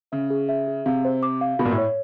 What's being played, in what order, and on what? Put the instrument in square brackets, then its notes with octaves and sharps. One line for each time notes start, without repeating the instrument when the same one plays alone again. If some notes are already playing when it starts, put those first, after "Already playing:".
[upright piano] C#3 [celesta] E5
[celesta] G#4
E5
G#4
[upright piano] C3 [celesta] F5
[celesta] C5
D6
F5
[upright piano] B2 [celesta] B5
[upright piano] A#2
A2
[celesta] C#5